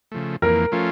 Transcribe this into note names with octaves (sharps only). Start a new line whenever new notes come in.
C#3 F3 A3
F2 E3 A#3 A#4
F3 A3 C#4 F4